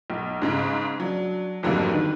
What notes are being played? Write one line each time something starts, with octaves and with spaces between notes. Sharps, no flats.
B1
G#2 C#3
F#3 D4
F2 G#2 D3 F#3 G3 A#3
D#3 B4